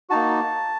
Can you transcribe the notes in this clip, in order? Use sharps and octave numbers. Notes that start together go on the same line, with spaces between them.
A#3 D#4 F#4 A5